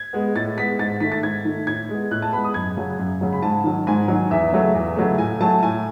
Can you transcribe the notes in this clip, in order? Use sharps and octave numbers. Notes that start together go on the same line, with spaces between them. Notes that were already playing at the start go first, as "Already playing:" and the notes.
Already playing: G#6
G#3 B3
A2 A6
G#3 B3 B6
G#2 A6
D#3 A3 B6
A6
G#2 G#6
D#3 A3
A2 G#6
G#3 B3
A2 F#6
A5
G#3 B3 B5
D#6
F#2 G#6
C#3 F#3
F#2
C#3 F#3
B5
G#2 A5
D#3 F#3
G#2 G#5
D#3 F#3
E2 E5
C#3 F#3 A3
E2
C#3 F#3 A3
A2 G#5
F#3 A3 A5
A2 G#5